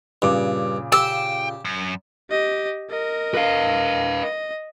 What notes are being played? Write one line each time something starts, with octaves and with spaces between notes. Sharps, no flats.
G2 A#2 C#3 D6
G4 G5 E6
F#2
G4 D#5
A#4 D#5
B4 F5
D#5